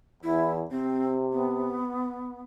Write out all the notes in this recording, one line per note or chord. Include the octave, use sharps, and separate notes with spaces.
E2 E4
C3 C4
B3